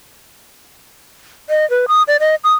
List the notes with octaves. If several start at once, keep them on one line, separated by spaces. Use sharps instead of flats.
D#5
B4
D#6
D5
D#5
D#6